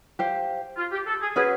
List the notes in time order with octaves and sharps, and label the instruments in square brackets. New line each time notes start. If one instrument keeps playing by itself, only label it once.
[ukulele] G4 C5 F5
[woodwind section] F4
G4
A4
G#4
[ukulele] C#4 F#4 B4 [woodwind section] G#4